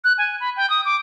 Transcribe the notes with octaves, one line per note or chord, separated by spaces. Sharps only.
F#6
G#5
B5
G5
D#6
D6